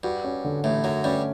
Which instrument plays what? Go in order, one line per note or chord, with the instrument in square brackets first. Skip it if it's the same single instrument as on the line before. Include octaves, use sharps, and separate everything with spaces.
[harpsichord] G2 [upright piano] F#4
[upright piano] C#4
D3
[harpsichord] A1 A2 [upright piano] A3
[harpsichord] F#2 F#3 [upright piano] F#4
[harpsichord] G2 G3 [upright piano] C#4